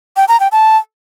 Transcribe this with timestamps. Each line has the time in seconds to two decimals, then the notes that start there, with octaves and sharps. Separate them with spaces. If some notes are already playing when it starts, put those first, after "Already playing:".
0.16 G5
0.28 A#5
0.40 G5
0.52 A5